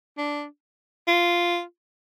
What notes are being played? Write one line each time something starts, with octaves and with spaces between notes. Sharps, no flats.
D4
F4